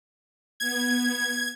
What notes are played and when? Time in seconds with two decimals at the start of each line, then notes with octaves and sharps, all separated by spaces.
0.60 B3 G#6